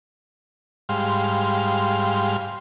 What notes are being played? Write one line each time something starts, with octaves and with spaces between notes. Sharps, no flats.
G#2 G3 F5 C6